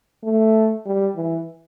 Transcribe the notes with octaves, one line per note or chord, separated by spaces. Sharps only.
A3
G3
E3